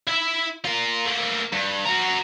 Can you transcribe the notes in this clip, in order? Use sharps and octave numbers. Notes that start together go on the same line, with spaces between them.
E4 E5
F4 A#4
A3 A#3
G2
F#4 A#4